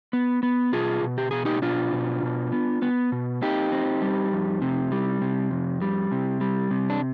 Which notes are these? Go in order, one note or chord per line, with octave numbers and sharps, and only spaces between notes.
B3
B3
B2 F4 G#4
B2
G4
B2 G#4
D#4 G4
B2 D4 F4
B2
B2
B3
B3
B2
C4 D#4 G4
C4
G3
F2
C3
G3
C3
F2
G3
C3
G3
C3
D4